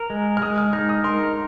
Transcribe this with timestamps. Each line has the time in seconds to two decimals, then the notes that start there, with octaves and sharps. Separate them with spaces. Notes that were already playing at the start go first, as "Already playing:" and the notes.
Already playing: A#4 A#5
0.10 G#3
0.37 F6
0.42 G#3 D#6
0.58 F6
0.73 D#4 F6
0.89 D#6
1.04 A#4 C6